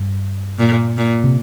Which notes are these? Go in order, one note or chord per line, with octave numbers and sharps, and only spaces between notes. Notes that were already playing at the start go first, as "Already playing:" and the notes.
Already playing: G2
A#2
A#2
C3